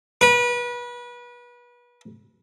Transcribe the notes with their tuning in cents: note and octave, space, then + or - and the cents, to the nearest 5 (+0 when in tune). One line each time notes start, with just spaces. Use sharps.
B4 -30